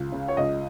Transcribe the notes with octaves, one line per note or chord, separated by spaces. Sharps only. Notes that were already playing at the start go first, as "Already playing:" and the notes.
Already playing: C#2
C#3
C#5
C#2 D#5